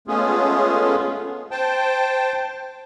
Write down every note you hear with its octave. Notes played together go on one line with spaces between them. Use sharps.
G#3 A3 B3 C#4 F4 G#4
C5 G5 A5